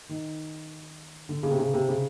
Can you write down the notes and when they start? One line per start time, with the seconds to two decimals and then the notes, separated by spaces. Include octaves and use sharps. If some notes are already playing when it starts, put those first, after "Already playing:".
0.09 D#3
1.29 D3
1.43 C#3
1.51 C3
1.59 C#3
1.74 C3
1.88 C#3